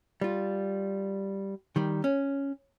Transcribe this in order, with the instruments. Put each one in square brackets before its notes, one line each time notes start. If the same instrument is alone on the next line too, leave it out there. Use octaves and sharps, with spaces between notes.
[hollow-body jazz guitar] G3 F4
D#3 G3
C#4